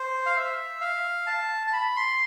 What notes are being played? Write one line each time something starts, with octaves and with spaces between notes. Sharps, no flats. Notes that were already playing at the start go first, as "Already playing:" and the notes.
Already playing: C5
F5
E5
F5
A5
A5
B5
C6